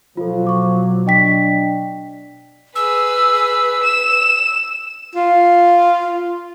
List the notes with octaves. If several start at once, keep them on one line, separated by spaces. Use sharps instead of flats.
B2 F3 F#3 F4 A4
C#6 D6
D4 D#5 G5 B6
G#4 B4 E6
E7
F4